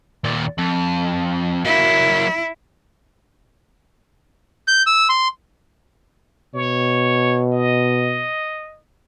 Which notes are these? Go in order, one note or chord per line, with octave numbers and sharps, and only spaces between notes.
D#2 A#2
F2
F#3 A#3 E4
G6
E6
C6
B2 C#5
D#5